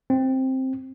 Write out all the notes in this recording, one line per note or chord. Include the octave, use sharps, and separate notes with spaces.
C4